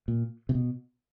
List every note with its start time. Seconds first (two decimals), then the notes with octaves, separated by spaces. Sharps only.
0.08 A#2
0.49 C3
0.55 B2